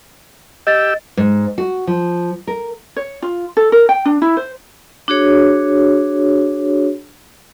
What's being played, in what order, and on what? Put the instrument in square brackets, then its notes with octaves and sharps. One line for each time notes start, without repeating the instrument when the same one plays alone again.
[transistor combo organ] G4 E6 [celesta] D#5 A6
[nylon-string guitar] G#2
F#4
F3
A#4
[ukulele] C#5
F4
A4
A#4
G5
D4
E4
C5
[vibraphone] D4 F#4 G#4 C#5